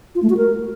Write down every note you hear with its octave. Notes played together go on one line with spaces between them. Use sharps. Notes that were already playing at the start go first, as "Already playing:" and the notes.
F4
A3
F#4
A#4